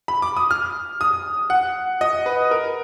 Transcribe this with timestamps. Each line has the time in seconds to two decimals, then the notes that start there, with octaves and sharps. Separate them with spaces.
0.08 B5
0.22 D6
0.37 D#6
0.51 F6
1.01 D#6
1.50 F#5
2.01 D#5
2.26 B4
2.51 A#4